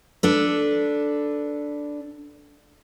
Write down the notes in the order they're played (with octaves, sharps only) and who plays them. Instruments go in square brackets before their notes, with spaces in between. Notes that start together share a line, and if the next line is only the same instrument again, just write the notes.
[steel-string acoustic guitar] D4 A4 B4